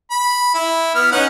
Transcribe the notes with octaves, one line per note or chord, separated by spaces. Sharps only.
B5
E4
B3 F6
C#4 D#4 F#5